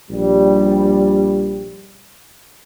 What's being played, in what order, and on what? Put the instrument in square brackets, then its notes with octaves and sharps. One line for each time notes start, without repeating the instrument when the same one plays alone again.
[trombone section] A#1 G3